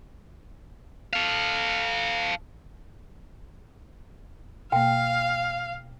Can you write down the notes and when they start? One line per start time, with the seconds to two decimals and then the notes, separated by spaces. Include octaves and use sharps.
1.13 A4 F5
4.72 B2 A#3 F5 G5